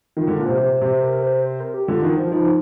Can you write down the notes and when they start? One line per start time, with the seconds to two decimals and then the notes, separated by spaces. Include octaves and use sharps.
0.17 D#3 F4
0.28 D3
0.31 A#4
0.39 A#2
0.46 C3 C5
0.59 C3 C5
0.75 C5
0.81 C3
1.03 A#4
1.23 C5
1.45 C5
1.60 A#4
1.74 G4
1.88 D3 F4
2.03 D#3
2.17 F3
2.31 F3 D#4